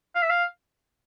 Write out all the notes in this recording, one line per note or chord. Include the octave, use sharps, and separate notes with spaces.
F5
E5
F5